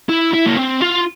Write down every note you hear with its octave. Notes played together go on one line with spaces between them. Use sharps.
E4
E4
A#3
C4
F4